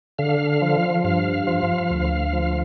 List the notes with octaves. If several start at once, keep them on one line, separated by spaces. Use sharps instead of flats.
D3 F5
F3
G2 F5
F3
D2
F3